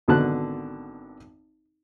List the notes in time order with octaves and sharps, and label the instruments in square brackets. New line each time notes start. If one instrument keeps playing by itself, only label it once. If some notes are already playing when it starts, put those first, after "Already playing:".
[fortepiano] G#1 B2 D3 A5 F#6